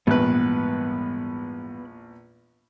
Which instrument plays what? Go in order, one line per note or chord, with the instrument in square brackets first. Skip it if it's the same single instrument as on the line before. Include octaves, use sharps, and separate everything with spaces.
[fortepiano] A#1 E2 B4 [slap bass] G#2 E3 G3 [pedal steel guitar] B3 F#6